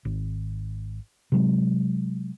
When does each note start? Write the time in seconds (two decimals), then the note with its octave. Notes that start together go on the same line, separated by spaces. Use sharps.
0.05 G#1
1.32 C3 F#3 G#3